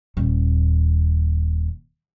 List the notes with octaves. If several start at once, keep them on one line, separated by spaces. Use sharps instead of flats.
D#1 D#2